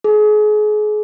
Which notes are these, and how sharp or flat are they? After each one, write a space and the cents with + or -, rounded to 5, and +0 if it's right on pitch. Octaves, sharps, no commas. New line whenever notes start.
G#4 +35